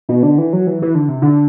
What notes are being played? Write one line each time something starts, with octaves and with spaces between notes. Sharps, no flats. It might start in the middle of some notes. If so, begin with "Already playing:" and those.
B2
D3
E3
F#3
E3
E3
D3
C3
D3